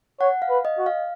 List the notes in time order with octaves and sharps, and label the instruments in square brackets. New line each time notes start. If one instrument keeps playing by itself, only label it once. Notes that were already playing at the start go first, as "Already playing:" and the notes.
[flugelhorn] C#5 [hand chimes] F#5
[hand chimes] F5
[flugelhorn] B4
[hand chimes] D#5
[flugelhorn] F#4
[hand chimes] F5